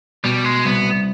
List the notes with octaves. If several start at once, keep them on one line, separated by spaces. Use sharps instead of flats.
B2 G3
G#3
C2 B3